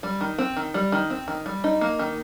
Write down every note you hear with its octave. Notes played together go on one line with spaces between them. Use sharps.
G3
D#3
C4
D#3
G3
D#3
C4
D#3
G3
D#4
A#3
D#3